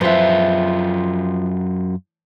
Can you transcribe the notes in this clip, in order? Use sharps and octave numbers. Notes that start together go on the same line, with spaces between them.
F#2 F3 F4 B4 E5